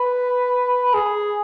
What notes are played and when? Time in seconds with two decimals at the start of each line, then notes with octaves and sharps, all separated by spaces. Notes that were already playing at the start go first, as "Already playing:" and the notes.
Already playing: B4
0.94 G#4